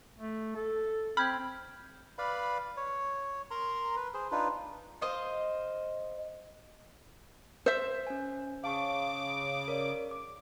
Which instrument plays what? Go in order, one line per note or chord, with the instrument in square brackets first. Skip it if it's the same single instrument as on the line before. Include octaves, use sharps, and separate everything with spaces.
[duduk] A3
A4
[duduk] C4 [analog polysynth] B5 [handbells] F6 G6 G#6
[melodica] B4 D5 F5 B5
C#5
A#4 A#5 C6
B4
G#4 C5
D4 D#4 F4 B4
[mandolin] C5 D#5 F5
[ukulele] C5 E5
[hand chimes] C#4 G#5
[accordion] C#3 D6 [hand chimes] F5 A5 C#6
[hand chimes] A#4 C#5 D5
D6